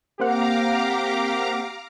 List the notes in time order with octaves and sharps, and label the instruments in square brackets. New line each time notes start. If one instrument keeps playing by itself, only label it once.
[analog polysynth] A#3 C4 F#5 [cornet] G4 [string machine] F5 A#5 D6